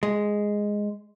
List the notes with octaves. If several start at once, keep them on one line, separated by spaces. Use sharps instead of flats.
G#3